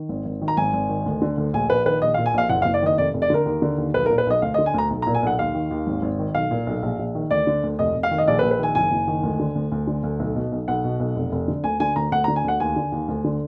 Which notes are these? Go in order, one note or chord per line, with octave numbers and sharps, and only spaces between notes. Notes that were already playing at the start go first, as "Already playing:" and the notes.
Already playing: D#3
G#1
G#1
D#3
A#5
G#1 G#5
G#1
D#3
D2
D3
D2
A#1 G#5
A#1 B4
D#3 B4
A#1 D#5
A#2 F5
G#5
A#1 F5
F#1 F#5
F5
F#1
D5
D#3 D#5
F1 D5
F1
D5
D3 A#4
D#2
D3
D#2
B1 B4
A#4
A#2
B4
B1 D#5
D2 F5
D#5
D3
G#5
D2 A#5
B1
A#5
A#2
G#5
B1 F#5
D#2 F5
D#3
D#2
G#1
G#1
D#3
B1 F5
A#2
B1
A#1
A#1
D#3
D2 D5
D3
D2
F1 D#5
F1
F5
D#3
D#5
A#1 D5
B4
A#1
B4
D#3 G#5
F#1 G#5
F#1
D#3
D2
D3
D2
D2
D3
D2
B1
B2
B1
B1 F#5
B2
B1
F1
F1
D3
D2 G#5
D3 G#5
D2 A#5
D2 F#5
A#5
D3
G#5
D2 F#5
D#2 G#5
D3
D#2
D2
D3